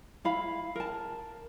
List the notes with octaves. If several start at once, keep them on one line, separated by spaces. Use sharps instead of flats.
E4 F5 B5
A#4 A5